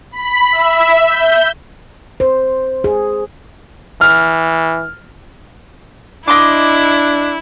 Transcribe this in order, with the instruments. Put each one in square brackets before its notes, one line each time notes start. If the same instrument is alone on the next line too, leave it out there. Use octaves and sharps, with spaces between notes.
[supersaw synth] B5
E5
G6
[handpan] C5
G#4
[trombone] E3 [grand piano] F6
[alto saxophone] D4 [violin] E4 [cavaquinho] D#5 C6 D6